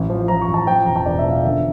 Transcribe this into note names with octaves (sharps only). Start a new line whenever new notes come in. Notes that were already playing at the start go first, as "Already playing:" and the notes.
Already playing: A1
F3
F3 A#5
C#6
A1
A5
F3 G5
E1 A#5
A5
E1 D5
E5
F3
F5
D3 E5